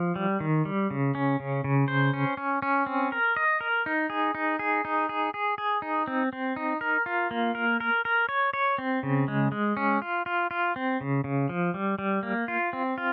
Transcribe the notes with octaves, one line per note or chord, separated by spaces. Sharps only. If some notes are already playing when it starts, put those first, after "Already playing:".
Already playing: F3
G3
D#3
G3
C#3
C#4
C#3
C#3
C5
C#4
C#4
C#4
C4
A#4
D#5
A#4
D#4
G#4
D#4
G#4
D#4
G#4
G#4
G#4
D#4
C4
C4
D#4
A#4
F4
A#3
A#4
A#4
A#4
C#5
C#5
C4
C#3
G#3
G#3
C#4
F4
F4
F4
C4
C#3
C#3
F3
G3
G3
A#3
F4
C4
F4